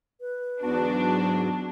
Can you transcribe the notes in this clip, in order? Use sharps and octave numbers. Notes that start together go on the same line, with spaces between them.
B4
E2 G#2 F#3 B3 D4 F#4